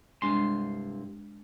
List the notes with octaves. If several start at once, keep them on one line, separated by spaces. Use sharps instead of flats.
C2 G2 G#3 D4 C6